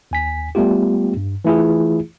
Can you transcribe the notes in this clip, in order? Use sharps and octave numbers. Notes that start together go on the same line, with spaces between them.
D#2 G#5 B6
G3 A3 B3 F4 G4
G2
E3 A3 E4 F4 G#4